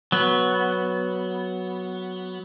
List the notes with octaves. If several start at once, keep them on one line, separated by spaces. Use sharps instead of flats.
F#3 B3